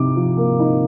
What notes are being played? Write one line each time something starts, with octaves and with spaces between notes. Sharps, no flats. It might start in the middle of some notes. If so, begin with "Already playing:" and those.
Already playing: C3 D#4 D6
F3
A#3
D#4